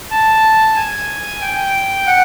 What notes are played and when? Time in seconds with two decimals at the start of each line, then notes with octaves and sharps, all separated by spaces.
0.11 A5
0.76 G#5
1.41 G5
2.07 F#5